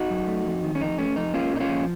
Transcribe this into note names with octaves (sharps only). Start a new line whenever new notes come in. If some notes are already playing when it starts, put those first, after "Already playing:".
Already playing: D#4 F#4
F#2
A3
F2
D#3
C#4
F2 D#4
A3 C#4
F2 D#4
A#3 C#4 F4
A#2 D#4
C#4 F4
F3